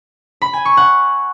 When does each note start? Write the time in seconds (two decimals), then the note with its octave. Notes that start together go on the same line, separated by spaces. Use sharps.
0.42 B5
0.53 G#5
0.65 C#6
0.77 F#5